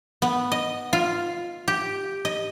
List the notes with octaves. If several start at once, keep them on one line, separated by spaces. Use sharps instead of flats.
B3
D#5
F4
G4
D#5